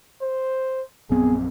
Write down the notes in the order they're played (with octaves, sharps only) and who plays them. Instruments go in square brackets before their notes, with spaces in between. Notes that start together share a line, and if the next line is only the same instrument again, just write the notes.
[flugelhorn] C5
[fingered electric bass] A#1 F#2 C4 [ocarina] B3 [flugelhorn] G#4